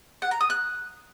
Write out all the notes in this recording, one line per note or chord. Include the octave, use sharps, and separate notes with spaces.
F#5
A#5
D#6
F#6